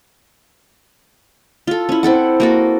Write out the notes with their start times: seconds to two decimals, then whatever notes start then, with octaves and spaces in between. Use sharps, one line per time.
1.67 F4 A4
1.89 C#4 E4
2.03 C4 E4 A4 F#5
2.40 A#3 F#4 A4